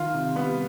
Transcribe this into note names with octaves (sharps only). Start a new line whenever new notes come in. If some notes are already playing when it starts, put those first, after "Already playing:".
Already playing: D#3 F4
C3
G3 B3